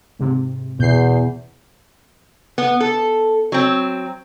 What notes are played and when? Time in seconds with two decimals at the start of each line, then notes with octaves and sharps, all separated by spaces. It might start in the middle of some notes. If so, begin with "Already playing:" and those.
0.19 G#2 C3
0.80 E2 B2 G6 C7
2.58 B3
2.81 A4
3.52 F#3 C4